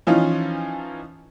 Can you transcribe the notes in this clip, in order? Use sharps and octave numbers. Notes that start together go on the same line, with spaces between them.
E3 F3 C#4 D#4 F4